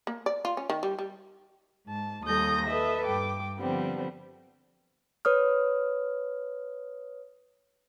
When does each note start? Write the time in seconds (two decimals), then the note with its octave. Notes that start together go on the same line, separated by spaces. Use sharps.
0.07 A#3
0.26 D5
0.45 F4
0.57 C#4
0.70 D#3
0.83 G3
0.99 G3
1.87 G#2 A5
2.25 D#2 G3 A4 D#6 G6 A#6
2.66 A4 B4 D#5 E5
3.05 G2 G5 D6
3.59 D3 F3 G3 B3 C4
5.25 B4 C#5 D#6 F6